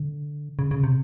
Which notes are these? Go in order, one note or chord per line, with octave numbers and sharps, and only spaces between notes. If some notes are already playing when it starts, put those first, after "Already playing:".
Already playing: D3
C#3
C#3
C3